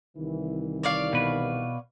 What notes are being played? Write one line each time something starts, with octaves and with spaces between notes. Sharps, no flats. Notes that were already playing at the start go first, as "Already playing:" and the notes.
C2 D#3 E3
C#5 D5 F5
B2 B4